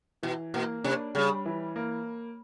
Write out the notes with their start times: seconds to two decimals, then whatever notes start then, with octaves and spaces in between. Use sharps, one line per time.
0.23 B2 E3
0.54 B2 A#3
0.84 C3 D4
1.15 C#3 G3
1.45 E3
1.76 A#3